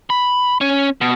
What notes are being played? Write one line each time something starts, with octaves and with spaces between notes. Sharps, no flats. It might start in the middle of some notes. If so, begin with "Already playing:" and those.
B5
C#4
B2